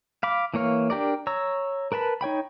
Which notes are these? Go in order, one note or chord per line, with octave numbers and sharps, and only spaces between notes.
F5 B5 D6
E3 A#3 C#5 F5
D4 G4 A#4 D5
C#5 A#5 E6
A#4 B4 A5 B5
D#4 C#5 G5 B5